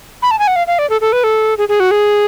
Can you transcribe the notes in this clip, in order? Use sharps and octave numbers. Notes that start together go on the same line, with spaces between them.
B5
A5
G#5
F#5
F5
F5
D5
A4
A4
B4
A4
G#4
G#4
F#4
G#4